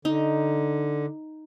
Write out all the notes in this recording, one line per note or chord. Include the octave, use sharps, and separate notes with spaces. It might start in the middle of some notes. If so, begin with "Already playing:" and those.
D3 D#4